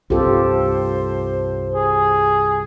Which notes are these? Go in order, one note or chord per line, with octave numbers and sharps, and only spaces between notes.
C2 G2 C4 F4 G4 A4 C5
G#4